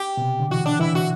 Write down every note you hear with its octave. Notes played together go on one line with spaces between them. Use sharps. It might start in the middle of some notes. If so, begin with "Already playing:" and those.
Already playing: G4
B2
C3
D3
E3 F#4
D4
E3 E4
F#4